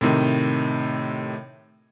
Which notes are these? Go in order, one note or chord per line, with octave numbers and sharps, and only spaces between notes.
A2 C3 D#3